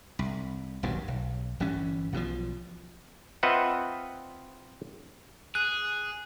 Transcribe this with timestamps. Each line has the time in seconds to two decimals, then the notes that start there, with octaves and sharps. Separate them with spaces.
0.19 C2
0.83 D#1 B1 G2 F#3
1.08 B1
1.60 G1 E3 G3 C#4
2.13 B1 B2 D3 F3
3.43 C4 F4 B4 D#5 E5 F#5
5.55 G#4 F#6